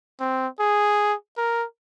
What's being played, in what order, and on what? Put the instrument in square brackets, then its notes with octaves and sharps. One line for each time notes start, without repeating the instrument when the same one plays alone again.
[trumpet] C4
G#4
A#4